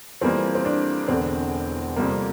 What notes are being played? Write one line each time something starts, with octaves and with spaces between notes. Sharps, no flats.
F2 E3 G3 A#3 C4
C4
D4
E1 E2 D3 C4
F2 C3 G3 A#3